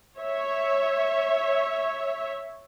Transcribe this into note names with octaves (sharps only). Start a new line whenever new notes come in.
C#5 E5